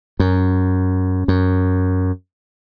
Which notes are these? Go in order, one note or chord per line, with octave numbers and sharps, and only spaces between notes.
F#2
F#2